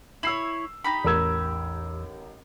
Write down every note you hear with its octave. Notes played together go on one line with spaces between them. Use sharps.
E4 C#5 E6 C7 F#7
D#4 G4 B5
A1 E2 A#4 E6 G#6